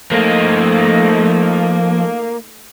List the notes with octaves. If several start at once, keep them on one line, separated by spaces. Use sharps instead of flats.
F3 A3 A#3 D#4 C5 D#5